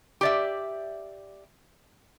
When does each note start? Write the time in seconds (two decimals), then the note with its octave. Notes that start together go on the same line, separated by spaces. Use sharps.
0.21 G4 D5 E5